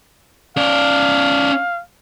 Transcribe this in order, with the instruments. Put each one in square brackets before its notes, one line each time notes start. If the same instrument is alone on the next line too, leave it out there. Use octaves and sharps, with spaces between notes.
[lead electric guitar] C#4 D5 [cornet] F5